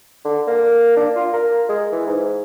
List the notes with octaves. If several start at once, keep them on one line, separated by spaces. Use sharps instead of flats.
D3
A#3
D4
F4
A#4
G#3
E3
G#2